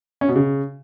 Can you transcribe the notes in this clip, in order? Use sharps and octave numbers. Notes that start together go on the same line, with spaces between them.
C#4
B2
C#3